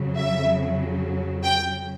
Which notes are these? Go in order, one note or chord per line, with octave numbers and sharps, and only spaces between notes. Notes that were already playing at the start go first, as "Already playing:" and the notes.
Already playing: F2 C#3 F#3
E5
G5